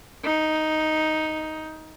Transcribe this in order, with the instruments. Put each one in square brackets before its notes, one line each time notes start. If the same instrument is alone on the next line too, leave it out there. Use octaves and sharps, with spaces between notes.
[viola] D#4